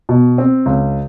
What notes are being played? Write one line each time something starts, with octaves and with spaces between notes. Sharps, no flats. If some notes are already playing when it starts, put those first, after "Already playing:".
B2
C4
C#2